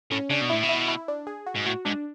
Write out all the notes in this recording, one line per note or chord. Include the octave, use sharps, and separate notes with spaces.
A2 C#4
C#3 D4
B2
A2 E4
B2
E4
E4
D4
G#4
F#4
G#2
A2 F#4
G#2 D4